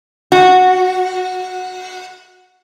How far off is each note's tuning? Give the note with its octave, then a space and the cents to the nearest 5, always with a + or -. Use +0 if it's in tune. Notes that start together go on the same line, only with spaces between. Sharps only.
F#4 -5